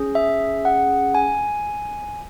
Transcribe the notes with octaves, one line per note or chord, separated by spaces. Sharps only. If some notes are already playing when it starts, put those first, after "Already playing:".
Already playing: C#4 G#4
E5
F#5
G#5